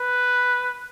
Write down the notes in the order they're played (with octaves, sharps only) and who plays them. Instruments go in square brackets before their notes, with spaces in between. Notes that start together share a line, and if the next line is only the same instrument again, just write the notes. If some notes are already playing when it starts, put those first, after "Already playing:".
Already playing: [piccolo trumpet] B4